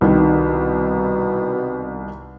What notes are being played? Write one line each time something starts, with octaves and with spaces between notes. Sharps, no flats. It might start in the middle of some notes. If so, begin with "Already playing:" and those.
C2 B2 D#3